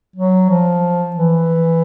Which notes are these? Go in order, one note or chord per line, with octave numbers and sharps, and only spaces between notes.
F#3
F3
E3